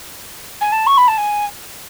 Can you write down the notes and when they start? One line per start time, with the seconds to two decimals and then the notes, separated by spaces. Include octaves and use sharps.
0.61 G#5
0.72 A5
0.86 C#6
0.97 B5
1.08 A5
1.17 G#5